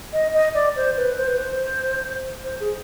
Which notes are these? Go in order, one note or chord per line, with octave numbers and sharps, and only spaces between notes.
D#5
D#5
D5
C5
B4
C5
B4
C5
C5
G#4